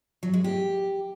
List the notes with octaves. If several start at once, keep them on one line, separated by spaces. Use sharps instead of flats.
F#3
G#3
G4